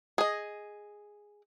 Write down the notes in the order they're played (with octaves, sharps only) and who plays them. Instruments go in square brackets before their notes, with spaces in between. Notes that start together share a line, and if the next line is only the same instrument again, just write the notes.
[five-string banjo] G#4 D#5